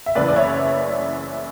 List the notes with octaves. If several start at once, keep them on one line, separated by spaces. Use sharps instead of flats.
E5
F#1 F#2 E3 B4 D5
D5
C#5 E5